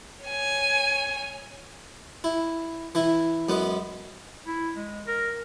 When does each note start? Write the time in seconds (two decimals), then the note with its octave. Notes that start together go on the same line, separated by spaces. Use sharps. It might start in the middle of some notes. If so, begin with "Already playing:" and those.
0.24 C#5 G#5
2.24 E4
2.95 E3 E4
3.49 F#2 G#3 B3
4.46 E4
4.75 G#3
5.07 A#4